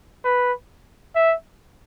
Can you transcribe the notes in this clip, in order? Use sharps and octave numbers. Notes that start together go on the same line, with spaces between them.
B4
E5